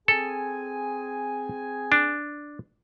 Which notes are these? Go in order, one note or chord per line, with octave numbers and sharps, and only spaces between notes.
C4 G#4 A4 G#5
D4